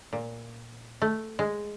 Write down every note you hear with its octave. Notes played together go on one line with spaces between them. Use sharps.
A#2
A3
G#3